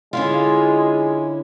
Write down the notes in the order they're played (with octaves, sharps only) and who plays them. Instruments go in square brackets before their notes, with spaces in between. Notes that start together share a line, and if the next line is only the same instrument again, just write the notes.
[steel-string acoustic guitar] D3 C#4 E4 [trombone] G#3 [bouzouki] F4